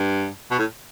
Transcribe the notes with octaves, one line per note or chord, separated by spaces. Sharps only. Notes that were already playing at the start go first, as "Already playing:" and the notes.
Already playing: G2
B2
A2